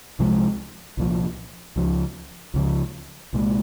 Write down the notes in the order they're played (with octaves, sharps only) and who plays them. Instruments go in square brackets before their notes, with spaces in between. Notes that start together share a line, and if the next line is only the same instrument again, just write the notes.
[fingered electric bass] C2 C3 F3 G#3
C2 A#2 F3
C#2 C#3 F3
C#2 C#3 F3
C2 A#2 G#3